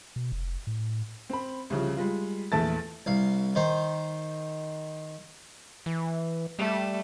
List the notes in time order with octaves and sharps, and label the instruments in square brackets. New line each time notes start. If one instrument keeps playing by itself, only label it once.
[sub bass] B2
F1
A2
[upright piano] C4 B5
C2 C#3 F3
G3 G#3 F4
A#1 E2 A3 E5 A5 A6
[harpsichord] C2 F5
D#3 C5
[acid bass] E3
[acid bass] G3 [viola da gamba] A3